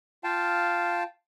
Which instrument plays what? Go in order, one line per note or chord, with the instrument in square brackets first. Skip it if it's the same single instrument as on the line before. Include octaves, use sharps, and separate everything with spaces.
[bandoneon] F4 F5 G5 A5